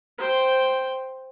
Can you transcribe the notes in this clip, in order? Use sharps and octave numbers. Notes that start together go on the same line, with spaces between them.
C5 G5